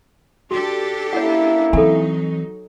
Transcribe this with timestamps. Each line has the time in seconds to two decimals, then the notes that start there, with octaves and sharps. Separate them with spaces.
0.51 D4 F#4 G4 A4
1.13 A#3 C#4 E4 C#5 F#5
1.73 E3 F#3 C4 D#4 A4 G#5